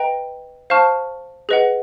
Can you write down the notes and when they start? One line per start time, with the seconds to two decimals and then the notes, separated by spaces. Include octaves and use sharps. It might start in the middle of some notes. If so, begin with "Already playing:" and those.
Already playing: B4 D#5 G5 A#5
0.70 C5 F5 A5 C#6 F6
1.49 G#4 B4 D#5 F#5